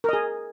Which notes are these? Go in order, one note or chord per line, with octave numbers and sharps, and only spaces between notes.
G#4 A#4 D#5